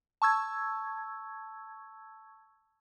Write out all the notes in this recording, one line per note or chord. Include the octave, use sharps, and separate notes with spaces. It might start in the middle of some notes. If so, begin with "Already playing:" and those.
A5 C#6 E6 G#6